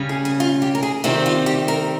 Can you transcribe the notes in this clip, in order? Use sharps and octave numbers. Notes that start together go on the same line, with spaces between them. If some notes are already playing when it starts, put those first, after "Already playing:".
Already playing: C#3 G3 C#4
G#4
G#4
F4
G4
A#4
G#4
C3 D#3 G3 C4 F4
F4
G4
A#4